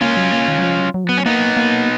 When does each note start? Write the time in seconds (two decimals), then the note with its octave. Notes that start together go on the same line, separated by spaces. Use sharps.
0.01 A#3 C#4 F4
0.17 F#3
0.32 A#3
0.48 D#3
0.59 F#3
0.64 F3
0.79 F#3
0.94 F#3
1.04 F3
1.09 F#3 B3
1.18 C#4
1.26 A#3 B3 D#4
1.57 A#3